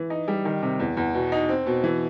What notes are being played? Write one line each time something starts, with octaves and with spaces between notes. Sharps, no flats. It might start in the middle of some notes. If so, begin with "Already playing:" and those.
Already playing: E3
D#4
G3
D#3
C3
E2
E2
B2
D#4
C4
B2
E3